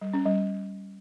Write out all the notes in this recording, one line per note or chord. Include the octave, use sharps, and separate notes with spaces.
G3
C#4
G3